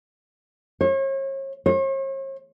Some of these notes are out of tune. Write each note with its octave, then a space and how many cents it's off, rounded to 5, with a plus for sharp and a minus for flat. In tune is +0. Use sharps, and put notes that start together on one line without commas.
C#5 -40
C#5 -45